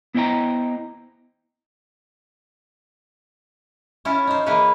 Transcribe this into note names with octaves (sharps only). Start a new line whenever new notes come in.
B3 E4 C5 D#5 G5 A#5
C#4 E4 F4 C#5
D#4 C5
E3 A#3 E4 G#4 B4 C#5